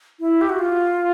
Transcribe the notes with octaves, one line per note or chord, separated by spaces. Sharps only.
E4
G4
F#4
F4